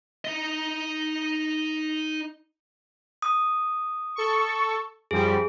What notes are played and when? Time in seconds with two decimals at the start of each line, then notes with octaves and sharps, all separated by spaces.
0.25 D#4 D#5
3.22 D#6
4.16 A4 C#6
5.11 F#2 F3 G3 G#4